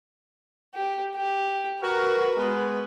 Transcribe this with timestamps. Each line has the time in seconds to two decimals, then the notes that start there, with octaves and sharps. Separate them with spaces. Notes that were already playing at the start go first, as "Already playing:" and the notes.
0.74 G4
1.15 G4
1.83 F#4 A#4 B4
2.37 G#3 B3